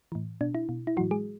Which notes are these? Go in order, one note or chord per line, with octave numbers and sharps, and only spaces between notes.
A2 E3
B2 D4
E4
B2
E4
A2 E3 F#3 F#4
G#3 G#4